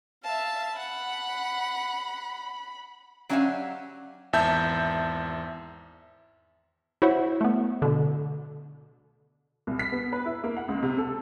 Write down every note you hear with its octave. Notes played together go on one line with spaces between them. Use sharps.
E5 F5 A5
F#5 B5
F#3 C#4 D4 G4 E5 F5
G#1 E2 E5 A5 G6
E4 F#4 C5 C#5 E5 F#5
A3 B3
B2 D3
C2
B6
B3
B4
E4
A#3
F#5
C#2
C3
A4